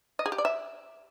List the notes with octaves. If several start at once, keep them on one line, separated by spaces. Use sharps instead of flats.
D#5
G#4
G4
D5
E5